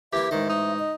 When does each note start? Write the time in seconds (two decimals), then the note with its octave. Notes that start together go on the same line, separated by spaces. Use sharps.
0.13 E3 A#3 E4 G4 E5
0.31 A1 G#2 D#3 D#5
0.49 D#4
0.79 D#5